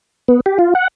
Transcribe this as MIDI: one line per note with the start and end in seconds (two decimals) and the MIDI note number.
0.28 0.40 59
0.46 0.58 67
0.59 0.74 65
0.75 0.88 78